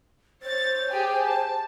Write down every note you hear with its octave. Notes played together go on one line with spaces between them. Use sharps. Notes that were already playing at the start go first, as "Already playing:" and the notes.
C5 C#5 A6
G4 G#4 G#5
A5